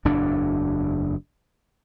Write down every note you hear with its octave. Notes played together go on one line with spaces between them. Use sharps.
F#1 E2 A2 D4